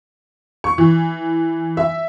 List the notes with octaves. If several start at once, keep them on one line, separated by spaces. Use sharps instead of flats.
C#6
E3
E5